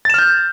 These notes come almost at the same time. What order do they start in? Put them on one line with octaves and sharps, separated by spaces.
A6 E7 F6 G6